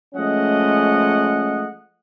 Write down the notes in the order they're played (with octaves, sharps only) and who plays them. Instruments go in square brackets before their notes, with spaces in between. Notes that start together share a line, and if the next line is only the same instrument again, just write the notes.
[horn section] F3 G#3 A3 C#4 D#5 F#5